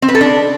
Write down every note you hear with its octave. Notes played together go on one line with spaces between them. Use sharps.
C4
B4
A4
D4